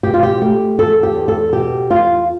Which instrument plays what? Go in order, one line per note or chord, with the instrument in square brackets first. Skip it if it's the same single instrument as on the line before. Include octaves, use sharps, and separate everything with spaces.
[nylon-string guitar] B2 G4
F4
G4
A3 G4
E2 A4
G4
E2
A4
B2 G4
E2 F4